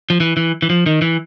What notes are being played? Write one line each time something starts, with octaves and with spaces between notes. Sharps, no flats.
F3
E3
E3
E3
F3
D#3
E3